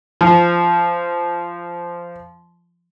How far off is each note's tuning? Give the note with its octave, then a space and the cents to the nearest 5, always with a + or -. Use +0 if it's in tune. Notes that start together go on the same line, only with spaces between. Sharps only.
F3 -15